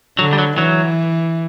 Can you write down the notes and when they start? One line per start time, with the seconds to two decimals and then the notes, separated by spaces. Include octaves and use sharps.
0.18 D3 F#3
0.33 G3
0.38 F#3
0.58 E3 F#3